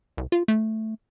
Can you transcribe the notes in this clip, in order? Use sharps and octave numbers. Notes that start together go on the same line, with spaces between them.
C2
F4
A3